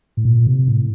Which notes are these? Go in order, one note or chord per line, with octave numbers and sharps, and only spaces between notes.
A2
A#2
C3
A2